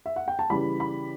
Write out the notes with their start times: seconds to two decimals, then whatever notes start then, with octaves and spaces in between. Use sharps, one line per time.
0.06 E5
0.16 F#5
0.28 G5
0.39 A5
0.50 C#3 E3 G3 B5
0.80 B5